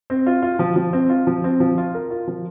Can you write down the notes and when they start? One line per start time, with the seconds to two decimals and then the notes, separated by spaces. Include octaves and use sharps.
0.10 C4
0.27 F4
0.42 F4
0.59 F3
0.76 F3
0.93 C4
1.10 F4
1.27 F3
1.44 C4
1.60 F3
1.78 F4
1.95 A#4
2.10 F4
2.27 F3